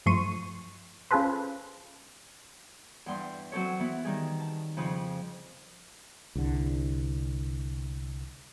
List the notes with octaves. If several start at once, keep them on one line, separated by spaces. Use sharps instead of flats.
G2 F3 A3 C6 C#6 D#7
C#4 F4 G#4 A4 B4 C5
E2 G2 G3 C6
F#3 C4 A4 C#5
E3 B3
D#3 G3 G#4
A5
F2 C#3 F3
C2 D3